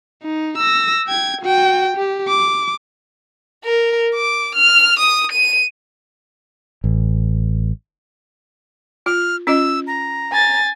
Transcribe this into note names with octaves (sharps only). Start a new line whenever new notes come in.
D#4
E6 A#6
G5 G#6
F#4 G5
G4
D6
A#4
D6
F6
D#6
D#7
A1
F4 F6
C#4 F4 D#5 E6
A#5
G#5 A6